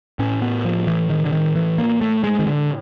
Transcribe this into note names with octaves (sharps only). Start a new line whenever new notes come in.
A2 C#4
B3
F3
E3
D#3
D3
D#3
E3
A#3
A3
G#3
D#3
D3